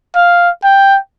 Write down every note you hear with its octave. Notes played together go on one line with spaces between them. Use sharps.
F5
G5